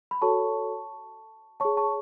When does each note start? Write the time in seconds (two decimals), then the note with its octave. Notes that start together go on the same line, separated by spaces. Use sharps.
0.11 B5
0.22 F#4 A4 C#5 A5 C#6
1.60 G#4 C#5 A5 C#6
1.77 A5 C#6